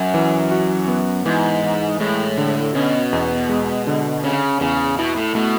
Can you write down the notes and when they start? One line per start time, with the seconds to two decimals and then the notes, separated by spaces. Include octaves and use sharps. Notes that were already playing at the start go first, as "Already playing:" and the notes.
Already playing: F#2
0.14 E3
0.51 F#4
0.88 B3
1.26 G#2 E3
1.64 E3
2.00 A2 G#3
2.38 D3
2.75 B2 C#4
3.13 E2
3.49 G#3
3.87 D3
4.24 C#3 C#4
4.61 E2 C#3
4.98 B2 E4
5.17 A2
5.35 B2 A3